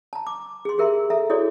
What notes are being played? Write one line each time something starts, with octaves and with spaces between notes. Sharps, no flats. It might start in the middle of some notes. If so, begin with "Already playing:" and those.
A5 A#5
D6
G#4 C6
G4 G#4 A#4 E5 A#5 C6
A4 E5 A#5
E4 F#4 G#4 A4 C#5 D5